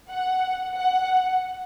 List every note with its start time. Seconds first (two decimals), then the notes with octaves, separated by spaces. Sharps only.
0.10 F#5
0.75 F#5